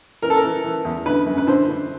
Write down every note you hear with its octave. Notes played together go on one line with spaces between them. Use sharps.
E3 A#4
A4
A#4
E3
E3
E2
D3 B4
F#2
B4
D3 C5
D3